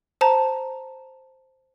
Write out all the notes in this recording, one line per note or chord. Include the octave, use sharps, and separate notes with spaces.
C5 A5 A#5